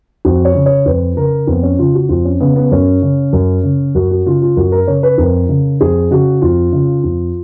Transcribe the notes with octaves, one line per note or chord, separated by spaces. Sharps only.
F2 F#4
C#5
C#3
C#5
F2 B4
C#3 A#4
F2 B3
C#4
C#3 F4
F#4
F2 F4
C#4
C#3 B3
B3
F#2 C#4
C#3
F#2
C#3
F#2 F#4
F#4
C#3 F4
F4
F#2 F#4
A#4
C#3 C#5
B4
F2 A#4
C#3
F2 G#4
C#3 F#4
F2 F4
C#3
F2